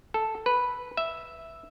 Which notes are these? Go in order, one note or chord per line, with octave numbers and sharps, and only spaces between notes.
A4
B4
E5